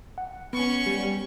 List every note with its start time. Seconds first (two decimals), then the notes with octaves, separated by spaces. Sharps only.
0.18 F#5
0.53 B3 C#4 C#6
0.86 G3